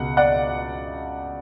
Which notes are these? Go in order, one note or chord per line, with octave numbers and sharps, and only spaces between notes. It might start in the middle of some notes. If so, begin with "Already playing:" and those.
Already playing: C#2 B2 F#5
D5 F#5